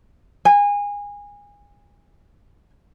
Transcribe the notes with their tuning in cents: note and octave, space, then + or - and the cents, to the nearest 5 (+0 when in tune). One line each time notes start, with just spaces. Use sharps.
G#5 -25